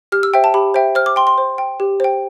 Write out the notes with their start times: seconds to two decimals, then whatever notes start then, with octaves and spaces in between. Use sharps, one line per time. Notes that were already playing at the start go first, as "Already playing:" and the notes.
0.12 G4 F6
0.23 E6
0.34 C5 E5 G5
0.44 A5
0.54 G4 B5
0.74 C5 E5 G5
0.95 C5 F6
1.06 D6
1.16 G5 C6
1.27 C6
1.38 C5
1.58 G5
1.80 G4
2.00 C5 G5